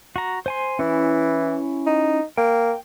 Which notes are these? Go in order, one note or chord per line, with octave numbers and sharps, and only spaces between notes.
F#4 A#5
C5 G#5 C6
E3 C#4 E4
D#4
A#3 G5